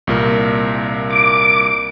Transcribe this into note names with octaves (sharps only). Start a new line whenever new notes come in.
C2 A#2 A#4
D6